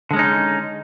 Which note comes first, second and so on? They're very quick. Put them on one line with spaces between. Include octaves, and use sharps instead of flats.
D3 G#3 C#4 D#4